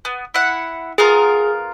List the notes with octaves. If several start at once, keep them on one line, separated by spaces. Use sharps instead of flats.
B3
E4 F#5
B3 F4 G#4 A#4